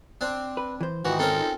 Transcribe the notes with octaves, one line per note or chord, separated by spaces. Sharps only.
C4 D4
B4
E3 C5
G#2 D#3 E3 D#4 F4 F#4 G5
C4 C#4 A4 A#4